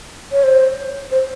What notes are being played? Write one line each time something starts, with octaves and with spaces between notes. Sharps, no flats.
C#5
C5
C5